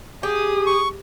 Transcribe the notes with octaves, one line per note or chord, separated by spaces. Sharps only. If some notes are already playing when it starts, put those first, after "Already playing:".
G4 G#4 D#6
C#6